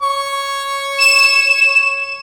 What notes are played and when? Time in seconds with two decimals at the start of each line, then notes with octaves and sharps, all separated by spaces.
0.02 C#5 C#6
0.98 E7